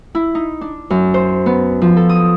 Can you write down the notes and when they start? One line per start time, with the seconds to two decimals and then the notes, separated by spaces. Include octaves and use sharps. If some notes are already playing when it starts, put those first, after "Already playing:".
0.15 E4
0.35 D#4
0.61 D4
0.90 F#2
1.14 C5
1.46 B3
1.82 F3
1.96 A4
2.09 D#6